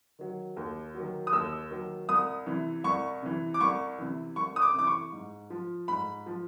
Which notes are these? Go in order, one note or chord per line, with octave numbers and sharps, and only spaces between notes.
D#3 F#3
D#2
D#3 F#3
D#6
D#2 E6
D#3 F#3
C2 D#6
C3 E3
C2 C#6
C3 E3
D6
C2 C#6
C3 E3
C2 C#6
D#6
D6
C3 E3 D6
C#6
G#2
F3
G#2 B5
F3